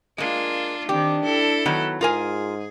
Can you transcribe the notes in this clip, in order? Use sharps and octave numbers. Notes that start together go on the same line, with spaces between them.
G#3 A#3 D4 F4
D#3 C4 D4 G4
E4 A4
D#3 F#3 B3
G#2 F4 G#4 A#4 G#5